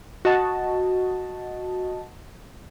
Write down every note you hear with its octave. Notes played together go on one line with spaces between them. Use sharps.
F#4 D#5 A5